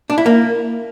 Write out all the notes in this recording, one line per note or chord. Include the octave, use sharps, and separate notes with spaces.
D4
E4
A#3